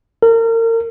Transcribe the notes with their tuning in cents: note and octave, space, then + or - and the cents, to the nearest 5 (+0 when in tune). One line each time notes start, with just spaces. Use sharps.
A#4 -35